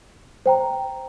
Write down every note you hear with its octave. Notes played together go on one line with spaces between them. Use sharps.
C5 G5 A#5